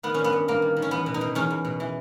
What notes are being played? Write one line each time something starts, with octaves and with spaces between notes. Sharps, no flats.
D#3 B3
G2 C#4
B3
G2
G2 A#3
D#3
D#3
C#4
E2 B3
B2
D#4
B2
E2 C#4
E2
B2
E3